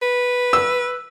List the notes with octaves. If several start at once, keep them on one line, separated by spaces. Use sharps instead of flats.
B4
E6